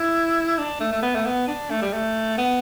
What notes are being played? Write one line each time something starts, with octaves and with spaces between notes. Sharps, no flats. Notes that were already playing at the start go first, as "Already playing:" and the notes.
Already playing: E4
D4
A3
A3
B3
A3
B3
D4
A3
G3
A3
B3